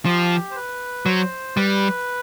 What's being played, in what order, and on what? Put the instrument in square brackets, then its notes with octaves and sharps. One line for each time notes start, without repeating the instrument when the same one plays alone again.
[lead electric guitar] F3 [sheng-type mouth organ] G4
[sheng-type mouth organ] C5
B4
[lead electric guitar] F#3 [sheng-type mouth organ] C5
[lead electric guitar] G3 [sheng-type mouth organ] B4